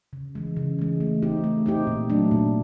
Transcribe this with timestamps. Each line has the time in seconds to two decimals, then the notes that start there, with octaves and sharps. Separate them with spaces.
0.13 C#3
0.35 E3 G#3
0.56 C#3
0.79 E3 G#3
1.00 A3
1.22 C4 D#4 G4
1.44 A3
1.66 C4 D#4 G4
1.87 A#2
2.10 F#3 A3 D4
2.31 A#2